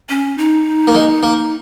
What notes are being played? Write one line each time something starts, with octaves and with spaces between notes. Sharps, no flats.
C#4
D#4
A#3
G#3
A#3